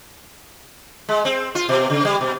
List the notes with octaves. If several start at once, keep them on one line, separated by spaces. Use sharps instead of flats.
G#3
C4
F4
B2
C#3
G3
B2